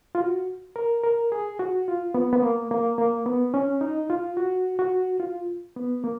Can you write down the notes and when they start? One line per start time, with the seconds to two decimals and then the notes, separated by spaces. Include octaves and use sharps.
0.15 F4
0.20 F#4
0.76 A#4
1.04 A#4
1.32 G#4
1.59 F#4
1.88 F4
2.14 B3
2.33 B3
2.42 A#3
2.71 A#3
2.98 A#3
3.26 B3
3.54 C#4
3.81 D#4
4.10 F4
4.37 F#4
4.79 F#4
5.20 F4
5.76 B3
6.04 A#3